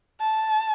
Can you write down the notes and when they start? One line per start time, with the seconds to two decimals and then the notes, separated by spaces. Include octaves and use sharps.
0.20 A5